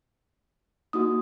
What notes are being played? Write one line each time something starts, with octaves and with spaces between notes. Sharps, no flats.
A#3 D#4 F#4 D#6